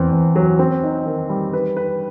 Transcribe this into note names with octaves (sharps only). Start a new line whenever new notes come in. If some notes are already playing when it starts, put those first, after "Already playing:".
Already playing: E2 C4
E2
F#3
C4
D#4
D#3
G3
B4
B4